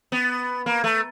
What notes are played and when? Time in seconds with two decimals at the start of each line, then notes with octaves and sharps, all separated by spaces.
0.12 B3
0.66 A#3
0.84 A3